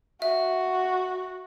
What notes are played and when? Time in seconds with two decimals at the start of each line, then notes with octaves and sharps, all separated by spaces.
0.22 F#4 E5